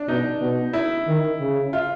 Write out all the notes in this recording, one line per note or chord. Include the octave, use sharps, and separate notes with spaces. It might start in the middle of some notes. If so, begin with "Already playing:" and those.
Already playing: D4
B2 D#4
B2
E4
D#3
C#3
F4